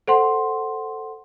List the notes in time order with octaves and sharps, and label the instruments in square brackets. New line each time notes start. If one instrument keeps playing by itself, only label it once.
[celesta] A4 C5 F#5 C6